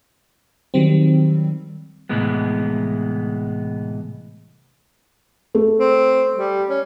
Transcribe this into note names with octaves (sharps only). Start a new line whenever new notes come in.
D#3 F#3 G3 C4
C2 A2 E3 G#3 B3
A3
C4
G3
C#4